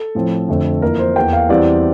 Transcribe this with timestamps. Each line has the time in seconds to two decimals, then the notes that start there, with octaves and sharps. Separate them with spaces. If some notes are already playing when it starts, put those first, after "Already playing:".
Already playing: A4
0.15 A2 F3 C4
0.49 F2 D3 A3 C4
0.82 F2 E3 A#3 A#4
0.99 C5
1.15 E2 E3 A#3 G5
1.33 F5
1.49 E2 E3 G3 C4 D5